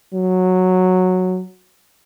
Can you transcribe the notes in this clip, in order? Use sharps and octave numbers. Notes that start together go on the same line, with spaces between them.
F#3